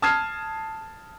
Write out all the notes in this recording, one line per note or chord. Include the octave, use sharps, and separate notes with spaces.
A5 D#6 F6 G#6 C7 E7